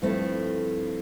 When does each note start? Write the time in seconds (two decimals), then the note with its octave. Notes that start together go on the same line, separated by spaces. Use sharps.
0.02 G2 F3 A3 C4 E4